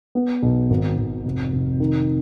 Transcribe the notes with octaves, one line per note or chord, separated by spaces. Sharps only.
B3
B1
G#1
G#1
F1
F1
D#3